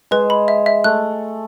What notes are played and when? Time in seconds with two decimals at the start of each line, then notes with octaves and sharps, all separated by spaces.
0.11 G#3 B4
0.30 B5
0.48 E5
0.66 E5
0.84 A3 F#6